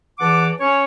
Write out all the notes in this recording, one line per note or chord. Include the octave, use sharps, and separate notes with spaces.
E2 E3 F#5 A5 D6
C#4 C#5